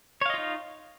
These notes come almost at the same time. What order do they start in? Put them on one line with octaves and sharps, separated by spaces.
C#5 F5 D#5 F4 D#4